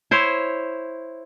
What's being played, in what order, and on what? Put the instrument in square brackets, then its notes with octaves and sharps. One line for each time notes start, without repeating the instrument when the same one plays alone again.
[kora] E4 C5 C#5